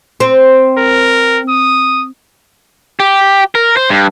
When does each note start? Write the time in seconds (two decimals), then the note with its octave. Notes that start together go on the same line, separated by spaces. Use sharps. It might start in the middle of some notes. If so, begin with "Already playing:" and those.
0.20 C4
0.77 A#4
1.49 D#6
3.00 G4
3.55 A#4
3.77 C5
3.89 G2